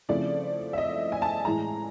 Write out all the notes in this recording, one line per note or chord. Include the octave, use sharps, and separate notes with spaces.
C#3 F3 A3 C4 E4 D5
E5
D#5
G#5
A5
A2 E3 G#3 A#5